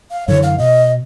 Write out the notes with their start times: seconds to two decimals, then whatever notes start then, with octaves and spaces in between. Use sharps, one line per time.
0.11 F5
0.28 F#2 D3 E3 C#5
0.43 F5
0.58 B2 D#5